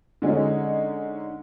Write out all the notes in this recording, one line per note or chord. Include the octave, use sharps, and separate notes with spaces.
D3 G#3 C#4 D#4